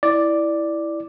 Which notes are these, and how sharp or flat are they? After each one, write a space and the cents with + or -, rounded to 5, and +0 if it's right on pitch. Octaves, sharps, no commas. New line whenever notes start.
E4 +0 D5 +0